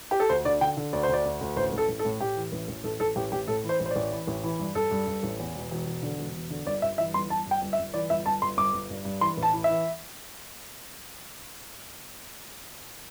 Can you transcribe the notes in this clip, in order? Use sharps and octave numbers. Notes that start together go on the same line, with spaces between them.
G4
A4
D2 C5
D3 D5
D3 G5
D3
D2 D5
C5
D2 D5
D2
D2
A1 C5
A1
A4
A1
A4
A2
A2 G4
E3
A1
A1
A1 A4
A1 A4
A1 G4
A1 G4
A2 A4
E3
C5
A1
C5
A1 D5
E3
A1
E3
G2
G2 A4
G2
G2
A1
E2
E1
E1
E1
D3
E1
E1
D3
G1 D5
G2 E5
E3 E5
G1 C6
G1 A5
G2 G5
G1
E5
G1
E3 D5
G1 E5
G1 A5
G1 C6
G1 D6
G1
G2
G2
E3 C6
A1
A5
E3
E5
E3